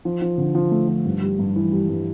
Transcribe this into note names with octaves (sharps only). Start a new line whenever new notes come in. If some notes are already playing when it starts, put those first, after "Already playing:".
F3
F3
D3
F3
A3
F3
G2
G3
G2
E3
G3
G2